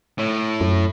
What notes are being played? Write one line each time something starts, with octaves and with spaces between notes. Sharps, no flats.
A2
F#2